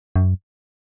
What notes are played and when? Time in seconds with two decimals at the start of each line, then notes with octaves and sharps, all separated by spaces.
0.16 F#2